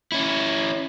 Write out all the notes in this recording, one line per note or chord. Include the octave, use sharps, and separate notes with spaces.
C#4 E4